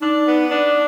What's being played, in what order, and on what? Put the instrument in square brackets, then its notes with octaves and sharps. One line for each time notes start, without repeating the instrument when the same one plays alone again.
[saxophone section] D4 [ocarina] D#4
[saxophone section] B3
D4